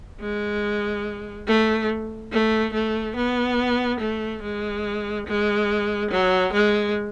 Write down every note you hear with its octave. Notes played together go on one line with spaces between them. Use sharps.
G#3
A3
A3
A3
B3
A3
G#3
G#3
F#3
G#3